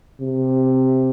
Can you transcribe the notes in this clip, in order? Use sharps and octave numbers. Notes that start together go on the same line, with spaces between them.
C3